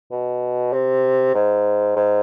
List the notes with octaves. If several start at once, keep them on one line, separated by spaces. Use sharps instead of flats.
B2
C3
G#2
G#2